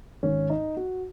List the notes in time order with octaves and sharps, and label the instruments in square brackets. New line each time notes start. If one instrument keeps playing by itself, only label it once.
[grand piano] G#1 G#2 D#3 C#4
D#4
F#4